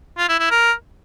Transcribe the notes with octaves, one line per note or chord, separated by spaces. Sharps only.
F4
E4
E4
A#4